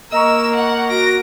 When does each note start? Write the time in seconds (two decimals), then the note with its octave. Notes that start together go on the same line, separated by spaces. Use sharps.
0.12 A#3 A#4 D#5 A#5 C#6 E6
0.56 F#5
0.90 F#4 A#6 D7